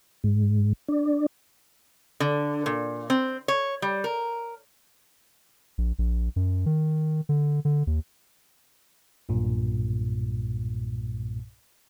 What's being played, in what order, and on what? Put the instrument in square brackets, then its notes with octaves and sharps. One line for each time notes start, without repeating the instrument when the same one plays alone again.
[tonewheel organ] G#2
D4
[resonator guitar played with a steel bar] D3
A#2
C4
C#5
G3
A#4
[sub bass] A#1
A#1
F#2
D#3
D3
D3
D#2
[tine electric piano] B1 G2 A#2